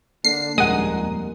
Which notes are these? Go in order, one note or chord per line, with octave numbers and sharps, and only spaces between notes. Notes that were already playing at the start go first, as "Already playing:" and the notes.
D3 A#3 D4 A4 C7
D#1 F2 A#2 G3 G#3 A#4 F#5 D#6